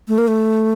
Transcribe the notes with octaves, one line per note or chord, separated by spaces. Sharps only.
A3
A#3
A3